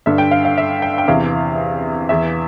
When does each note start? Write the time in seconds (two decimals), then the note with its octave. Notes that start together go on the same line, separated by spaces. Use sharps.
0.06 G2 D3 E5
0.18 G5
0.31 F5
0.45 F5
0.58 E5
0.82 G5
0.98 G5
1.08 E2 C3 E3 F5
2.09 E2 E3 E5